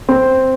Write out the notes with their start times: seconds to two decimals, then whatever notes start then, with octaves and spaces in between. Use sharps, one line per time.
0.09 C4